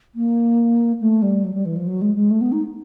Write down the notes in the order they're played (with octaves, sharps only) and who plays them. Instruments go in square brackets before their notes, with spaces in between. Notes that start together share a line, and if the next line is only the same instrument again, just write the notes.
[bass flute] A#3
A3
G3
F#3
G3
E3
F3
F#3
G#3
G#3
A3
B3
D#4